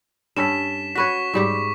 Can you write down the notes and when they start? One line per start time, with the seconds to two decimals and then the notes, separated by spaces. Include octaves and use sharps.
0.36 G2 C#4 A4 B6 E7
0.95 F#4 B4 C#5 C#6 B6
1.34 G#2 G3 G4